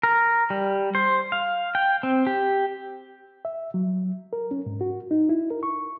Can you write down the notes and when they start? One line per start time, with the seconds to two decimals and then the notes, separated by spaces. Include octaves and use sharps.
0.03 A#4
0.50 G3
0.95 C5
1.32 F5
1.75 G5
2.03 C4
2.27 G4
3.45 E5
3.74 F#3
4.33 A#4
4.51 C#4
4.66 G#2
4.81 F#4
5.11 D#4
5.29 E4
5.51 A#4
5.63 C#6